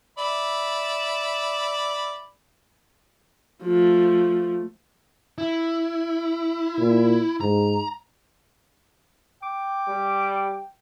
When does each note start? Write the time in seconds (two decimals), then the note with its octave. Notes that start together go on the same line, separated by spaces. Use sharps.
0.18 D5 E5 B5
3.63 F3 A3
5.38 E4
6.78 A#2
7.41 G#2 A#5
9.43 G5 D6
9.88 G3